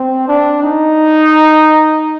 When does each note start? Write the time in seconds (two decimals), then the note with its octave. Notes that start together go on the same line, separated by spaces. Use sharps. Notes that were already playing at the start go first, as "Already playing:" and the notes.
Already playing: C4
0.28 D4
0.63 D#4